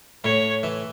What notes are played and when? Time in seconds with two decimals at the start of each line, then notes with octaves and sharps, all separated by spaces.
0.24 A2 C#5
0.63 E3